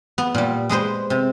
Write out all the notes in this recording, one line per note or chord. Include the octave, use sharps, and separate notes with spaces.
B3
A#2 G3
G#3 G#4 B4 C5
C3